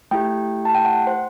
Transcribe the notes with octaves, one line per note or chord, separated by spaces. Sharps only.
A3 E4 G4 G5
A5
G5
F#5
C5